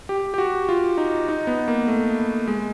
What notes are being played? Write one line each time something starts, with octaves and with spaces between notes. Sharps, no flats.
G4
G4
F#4
F4
D#4
D#4
B3
A#3
A3
G#3